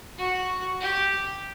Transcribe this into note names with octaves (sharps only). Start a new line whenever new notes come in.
F#4
G4